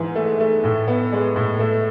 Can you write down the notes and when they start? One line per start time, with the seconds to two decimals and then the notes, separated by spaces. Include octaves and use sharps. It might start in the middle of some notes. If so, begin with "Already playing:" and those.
Already playing: G#2 E3
0.15 A3
0.40 A3
0.64 A2
0.88 B3
1.12 G#3
1.36 A2
1.59 A3